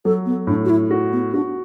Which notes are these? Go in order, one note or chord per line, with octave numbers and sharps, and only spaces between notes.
F#3 A4
B3
A2 D4
F#4
E4
F#4
B3
D4 F#4